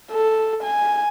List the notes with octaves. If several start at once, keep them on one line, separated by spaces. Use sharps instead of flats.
A4
G#5